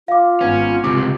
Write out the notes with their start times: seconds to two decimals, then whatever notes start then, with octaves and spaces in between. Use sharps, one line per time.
0.08 F4 F5 D6
0.41 G#1 B3 C#4
0.84 C#2 C3 D6